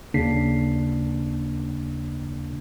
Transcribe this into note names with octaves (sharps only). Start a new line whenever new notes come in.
D#2 C#3 A#3 D4 B6 C7